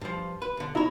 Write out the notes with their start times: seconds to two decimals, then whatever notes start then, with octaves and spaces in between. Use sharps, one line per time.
0.01 G2 F3
0.42 B4
0.57 B1 D3
0.75 D#4 E4 C#5 A#5 B5